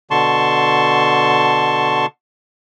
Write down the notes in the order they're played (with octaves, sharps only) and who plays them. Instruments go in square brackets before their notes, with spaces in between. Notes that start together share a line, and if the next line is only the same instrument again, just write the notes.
[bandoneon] B2 D3 A5 C6 C#6